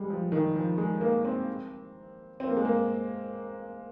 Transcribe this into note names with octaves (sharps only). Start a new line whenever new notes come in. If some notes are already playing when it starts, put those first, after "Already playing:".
Already playing: G3 G#3
F3
D#3
F3
G#3
A#3
C4
C4
A#3
G#3
A#3